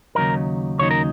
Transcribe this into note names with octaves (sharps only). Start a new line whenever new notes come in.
D#2 C#3 F#3 D#4 A#4
D#2 C#3 F#3 D#4 C#5
A#4